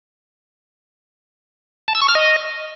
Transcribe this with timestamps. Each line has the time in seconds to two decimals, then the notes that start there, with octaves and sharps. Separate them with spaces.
1.88 A5
1.95 E6
2.02 C#6
2.08 F6
2.15 D#5